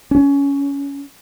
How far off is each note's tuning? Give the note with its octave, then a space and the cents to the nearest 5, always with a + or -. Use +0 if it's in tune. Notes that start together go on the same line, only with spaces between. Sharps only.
C#4 +15